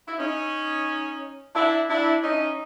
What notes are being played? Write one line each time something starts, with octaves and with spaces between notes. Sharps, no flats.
E4
C#4 D#4
D4 E4
D4 E4
C#4 D#4